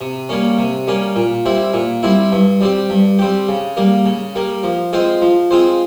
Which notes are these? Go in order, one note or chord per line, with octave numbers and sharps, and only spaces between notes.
C3
G3 A#3 C#4
C3
G3 A#3 C#4
A#2
G3 C4 E4
A#2
G3 C4 E4
G2
G3 C4 G4
G2
G3 C4 G4
C#3
G3 A#3
C#3
G3 A#3
F3
G#3 C4 F4 C5
F3
G#3 C4 F4 C5